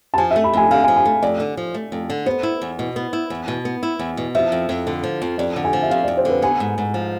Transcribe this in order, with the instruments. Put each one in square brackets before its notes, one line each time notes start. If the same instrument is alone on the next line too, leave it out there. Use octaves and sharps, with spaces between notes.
[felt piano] A5
[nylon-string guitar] F3 [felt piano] G#5
[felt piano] E5
[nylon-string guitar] A3
[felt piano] B5
[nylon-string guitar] F2 [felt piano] G#5
[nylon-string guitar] D3 [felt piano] F5
[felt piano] G#5
[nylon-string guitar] F3
[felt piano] G#5
[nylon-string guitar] A3
[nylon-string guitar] F2 [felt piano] D5
[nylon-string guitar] D3
F3
A3
F2
D3
[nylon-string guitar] B3 [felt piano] C5
[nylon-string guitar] E4
E2
B2
B3
E4
E2
B2
B3
E4
E2
B2
[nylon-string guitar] F3 [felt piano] E5
[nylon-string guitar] F2
F2
D3
F3
F2
[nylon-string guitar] F2 [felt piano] D5
[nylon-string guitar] D3
[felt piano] G#5
[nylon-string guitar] F3
[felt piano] E5
[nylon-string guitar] F2 [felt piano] F5
[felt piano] D5
[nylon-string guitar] F2
[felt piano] C5
[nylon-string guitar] D3 [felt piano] B4
[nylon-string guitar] B3 [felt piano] G#5
[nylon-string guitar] G#2
G#2
F3